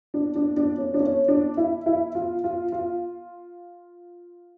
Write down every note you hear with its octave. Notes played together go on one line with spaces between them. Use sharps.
D4
D4
D4
C#4
D4
C#4
D4
E4
E4
F4
F4
F4